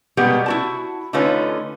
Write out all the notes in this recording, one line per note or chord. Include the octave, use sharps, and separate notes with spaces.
B2 G3 G#3 B3 G4 A#4
E4 F#4 A5
D3 A3 C#4 D#4 F4 B4